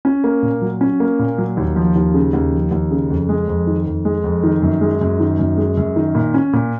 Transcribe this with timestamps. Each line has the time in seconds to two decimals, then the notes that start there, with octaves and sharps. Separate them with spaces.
0.05 C#4
0.24 A#3
0.42 A#2
0.62 F#3
0.81 C#4
1.00 A#3
1.19 A#2
1.38 F#3
1.57 D#2
1.76 F3
1.96 D#2
2.14 C#3
2.33 D#2
2.52 F3
2.71 D#2
2.91 C#3
3.10 F2
3.29 G#3
3.48 F2
3.67 D#3
3.86 F2
4.05 G#3
4.24 F2
4.43 D#3
4.62 F#2
4.81 G#3
5.01 F#2
5.19 D#3
5.39 F#2
5.57 G#3
5.77 F#2
5.96 D#3
6.15 A#2
6.34 C#4
6.53 A#2